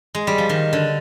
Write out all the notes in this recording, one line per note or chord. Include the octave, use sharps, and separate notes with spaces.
G#3
G3
F3
D#3
D3